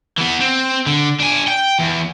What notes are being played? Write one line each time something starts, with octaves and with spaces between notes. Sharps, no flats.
E3 B3
C4
D3
D4 G#5
G5
E2